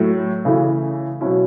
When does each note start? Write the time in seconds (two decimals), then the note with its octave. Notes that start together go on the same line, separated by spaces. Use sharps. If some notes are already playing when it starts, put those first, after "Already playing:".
Already playing: A2 F#3 A3 E4
0.45 C#3 E3 A3 E4
1.21 B2 F#3 C#4 E4